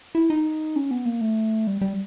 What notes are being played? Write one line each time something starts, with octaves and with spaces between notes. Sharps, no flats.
E4
D#4
C#4
B3
A#3
A3
G3
G3